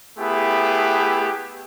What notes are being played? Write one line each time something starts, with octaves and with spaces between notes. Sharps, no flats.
A3 B3 E4 G4 G#4